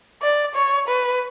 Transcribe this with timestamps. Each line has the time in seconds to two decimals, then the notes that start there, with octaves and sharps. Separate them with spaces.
0.22 D5
0.55 C#5
0.89 B4